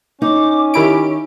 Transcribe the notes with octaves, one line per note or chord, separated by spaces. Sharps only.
C#4 D#4 D6
D#3 E4 G4 D7